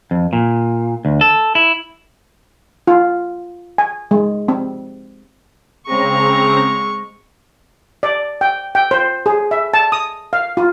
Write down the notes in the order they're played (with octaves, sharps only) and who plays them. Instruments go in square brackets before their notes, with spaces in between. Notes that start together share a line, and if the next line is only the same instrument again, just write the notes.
[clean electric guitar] F2
A#2
D2
A4
E4
[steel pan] F4
G#5
G#3
C4
[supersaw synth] C#3 C4 A#5 [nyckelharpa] G#3 C#6
[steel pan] D5
G5
G5
C5
G#4
E5
A5
D#6
F5
F4